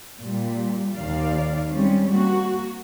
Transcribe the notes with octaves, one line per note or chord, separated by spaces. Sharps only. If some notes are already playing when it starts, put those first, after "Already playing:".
A#2 G3
D#2 D#3 D5 F5
G3 G#3 C4 C#4
A#3 F#4